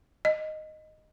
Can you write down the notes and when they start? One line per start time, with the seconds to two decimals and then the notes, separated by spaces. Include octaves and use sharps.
0.25 D#5